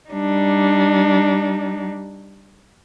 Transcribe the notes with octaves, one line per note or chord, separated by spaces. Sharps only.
G3 D4 D#4